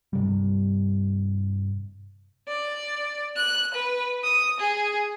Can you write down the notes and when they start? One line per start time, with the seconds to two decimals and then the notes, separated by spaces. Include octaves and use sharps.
0.13 G2 C3 G3
2.48 D5
3.36 F#6
3.74 B4
4.24 D#6
4.60 G#4